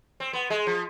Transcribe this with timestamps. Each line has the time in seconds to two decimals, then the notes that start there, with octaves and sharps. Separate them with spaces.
0.20 C4
0.33 B3
0.50 G#3
0.67 F3